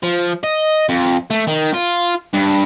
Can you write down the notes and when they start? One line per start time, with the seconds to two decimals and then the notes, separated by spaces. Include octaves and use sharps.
0.03 F3
0.44 D#5
0.89 F2
1.31 A3
1.48 D#3
1.74 F4
2.34 G2